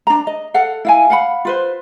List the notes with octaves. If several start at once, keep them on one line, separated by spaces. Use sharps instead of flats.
D4 A#5
D#5
A4 F5 F#5
E4 F5 G#5
F5 F#5 B5
F4 B4 C5